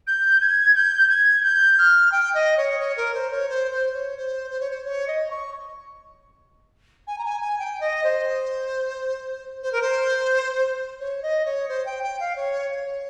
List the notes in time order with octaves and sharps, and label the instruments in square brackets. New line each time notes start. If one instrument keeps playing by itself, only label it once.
[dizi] G6
G#6
G6
G#6
G6
F6
G5
D#5
C#5
C#5
A#4
C5
C#5
C5
C5
C#5
C5
C5
C#5
C5
C#5
D#5
C#6
G#5
A#5
G#5
G#5
G5
D#5
C5
C5
A#4
C5
C#5
D#5
C#5
C5
G5
G5
F5
C#5
C#5